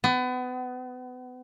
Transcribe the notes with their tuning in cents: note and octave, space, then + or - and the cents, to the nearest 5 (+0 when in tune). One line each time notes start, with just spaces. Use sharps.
B3 +30